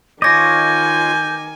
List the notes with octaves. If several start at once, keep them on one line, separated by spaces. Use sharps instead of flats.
D#3 F4 C#5 D#5 G#5 D6 G6 A#6